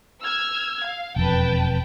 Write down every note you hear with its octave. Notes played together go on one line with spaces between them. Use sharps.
E6 F6 G#6
F5
E1 F2 B4 G5 A5